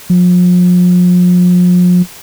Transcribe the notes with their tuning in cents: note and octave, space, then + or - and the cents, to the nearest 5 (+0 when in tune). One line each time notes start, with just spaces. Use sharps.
F3 +40